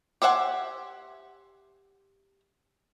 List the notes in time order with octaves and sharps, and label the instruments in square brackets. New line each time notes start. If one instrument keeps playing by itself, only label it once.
[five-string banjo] G4 C5 E5 F#5 G#5